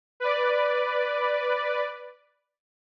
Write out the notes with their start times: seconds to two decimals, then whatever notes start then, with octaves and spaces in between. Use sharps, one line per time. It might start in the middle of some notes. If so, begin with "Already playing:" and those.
0.20 B4 D5